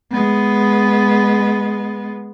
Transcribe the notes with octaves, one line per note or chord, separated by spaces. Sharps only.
G#3 B3